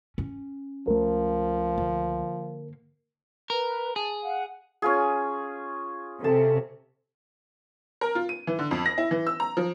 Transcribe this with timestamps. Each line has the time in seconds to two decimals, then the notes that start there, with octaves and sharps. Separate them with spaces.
0.18 C#4
0.87 C#2 F3 A3 A#4
1.78 D3 A#3
3.50 A#4 B4
3.96 G#4 A5
4.23 F5 F#5
4.82 C#4 F4 G#4
6.24 C3 A4 A5
8.01 A#4
8.15 F4
8.29 D#7
8.47 E3
8.59 D3
8.71 F2
8.86 A#6
8.98 E4
9.11 E3
9.27 E6
9.40 A#5
9.57 F3